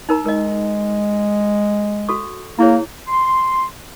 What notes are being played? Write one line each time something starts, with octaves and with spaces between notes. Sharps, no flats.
D#4 A#4 A#5
G#3 A#4 D#5
F#4 A4 C#6
A#3 E4 G#4 C#5
C6